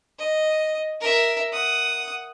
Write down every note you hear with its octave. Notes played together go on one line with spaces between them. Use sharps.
D#5
A#4 E5
F#5 D#6